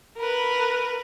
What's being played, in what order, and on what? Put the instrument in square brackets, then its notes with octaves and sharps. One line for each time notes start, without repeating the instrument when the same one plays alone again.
[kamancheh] A#4 B4